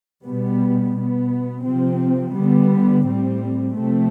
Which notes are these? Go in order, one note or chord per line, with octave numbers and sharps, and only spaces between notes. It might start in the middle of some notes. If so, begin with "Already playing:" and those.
B2 G3 B3
B2 B3
C3 F3 C4
D3 G3 B3
A2 G3 C4
C3 F3 A3 C4